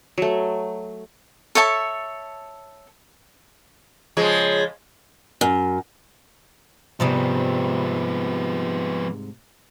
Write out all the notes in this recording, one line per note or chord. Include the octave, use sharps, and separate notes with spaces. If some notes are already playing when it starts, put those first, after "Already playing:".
F#3 A3
A4 C#5 E5 A5
C#3 F3 G#3
F#2
G#2 C3 F3 G3 B3